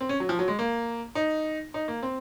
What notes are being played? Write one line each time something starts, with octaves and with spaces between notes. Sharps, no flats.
C4
C#4
F#3
F3
F#3
G#3
A#3
D#4
D#4
A#3
C4